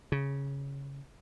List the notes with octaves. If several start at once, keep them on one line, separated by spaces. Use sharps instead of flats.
C#3